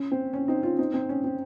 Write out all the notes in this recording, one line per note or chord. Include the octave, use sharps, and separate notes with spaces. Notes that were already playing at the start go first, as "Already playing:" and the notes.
Already playing: C#4
C4
C#4
C4 D#4
C#4 F4
C4 D#4
C4 D#4
C#4
C4